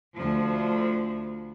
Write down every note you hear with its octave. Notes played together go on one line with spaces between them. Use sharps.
D2 F3